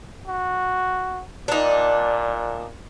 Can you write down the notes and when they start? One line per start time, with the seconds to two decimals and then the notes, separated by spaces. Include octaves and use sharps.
0.27 F#4
1.48 A#2 D4 D#4